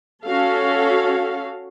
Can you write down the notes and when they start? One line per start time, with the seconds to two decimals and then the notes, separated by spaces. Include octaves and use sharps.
0.25 C#4 F#4 A4 F5